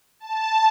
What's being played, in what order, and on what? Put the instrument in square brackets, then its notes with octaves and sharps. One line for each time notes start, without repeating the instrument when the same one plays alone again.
[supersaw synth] A5